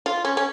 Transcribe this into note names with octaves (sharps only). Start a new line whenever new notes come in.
F4
C#4
C#4